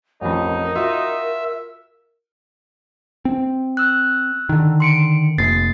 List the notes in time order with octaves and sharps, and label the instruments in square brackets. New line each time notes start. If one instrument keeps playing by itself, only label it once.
[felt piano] A1 F2 [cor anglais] D#4 [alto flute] A#4
[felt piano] F4 F#4 [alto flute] A#4 [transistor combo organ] E5
[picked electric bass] C4
[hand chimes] E6 F#6
[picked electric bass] D3 D#3
[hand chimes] C6 C#7 D7
[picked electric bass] F1 [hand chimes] A#3 A6 C7